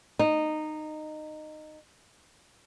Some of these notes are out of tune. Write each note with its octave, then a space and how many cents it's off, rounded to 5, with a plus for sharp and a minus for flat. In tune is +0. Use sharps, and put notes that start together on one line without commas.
D#4 -15